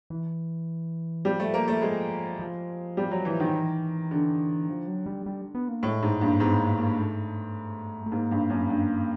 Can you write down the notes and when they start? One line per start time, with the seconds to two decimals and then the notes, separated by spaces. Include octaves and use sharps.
0.10 E3
1.25 F3 G3
1.40 A3
1.54 A#3
1.68 A3
1.82 G#3
2.39 F3
2.97 G3
3.11 F#3
3.25 E3
3.40 D#3
3.54 E3
4.11 D3
4.69 F3
4.88 F#3
5.06 G3
5.26 G3
5.55 B3
5.69 A#3
5.83 A2 G#3
6.02 G#2 A3
6.21 G2 A#3
6.40 G#2 B3
6.59 A#3
6.78 A#3
6.97 A3
8.06 A3
8.12 G#2 A#3
8.31 G2
8.50 F#2
8.69 G2